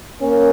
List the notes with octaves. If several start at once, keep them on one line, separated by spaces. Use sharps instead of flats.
A#3 C#4